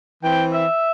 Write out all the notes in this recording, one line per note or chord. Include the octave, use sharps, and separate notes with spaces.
E3 C4 G5
E5